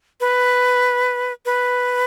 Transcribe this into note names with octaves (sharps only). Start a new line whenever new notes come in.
B4
B4